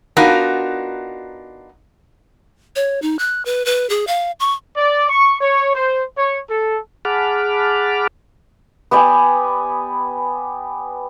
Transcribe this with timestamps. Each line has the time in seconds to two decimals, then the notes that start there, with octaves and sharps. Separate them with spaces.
0.17 B3 D4 D#4 F4 F#4 A#4
2.76 C#5
3.02 D#4
3.19 F#6
3.45 B4
3.66 B4
3.90 G#4
4.07 F5
4.40 C#6
4.76 D5
5.09 C#6
5.41 C#5
5.74 C5
6.18 C#5
6.50 A4
7.05 G#4 F#5 A5 B5 D6 F6
8.91 B3 G4 D5 G#5